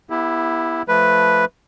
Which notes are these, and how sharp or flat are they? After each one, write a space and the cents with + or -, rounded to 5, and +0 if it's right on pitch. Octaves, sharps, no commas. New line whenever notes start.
B3 -25 E4 +0 G4 +30
F3 +0 A3 -10 B4 +0